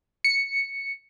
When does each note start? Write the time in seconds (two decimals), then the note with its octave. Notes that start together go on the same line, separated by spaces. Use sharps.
0.24 C#7